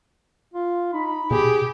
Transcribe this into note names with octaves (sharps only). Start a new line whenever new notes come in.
F4
D#4 B5
B2 G4 G#4